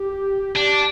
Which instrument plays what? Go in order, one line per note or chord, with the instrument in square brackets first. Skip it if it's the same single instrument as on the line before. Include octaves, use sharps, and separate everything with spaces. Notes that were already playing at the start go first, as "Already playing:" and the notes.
Already playing: [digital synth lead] G4
[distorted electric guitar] D4 [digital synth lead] G4